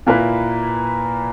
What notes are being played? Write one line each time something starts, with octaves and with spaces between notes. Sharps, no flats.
A#2 A#3 E4 B4